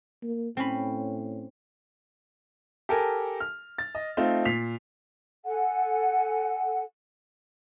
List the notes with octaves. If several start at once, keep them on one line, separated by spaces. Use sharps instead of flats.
A#3
A2 C4 C#4 B5
G4 A4 A#4 G#5
F6
A6
D#5
A3 C4 D#4 F4
A#2 B6 C7 F7
A4 F#5 G#5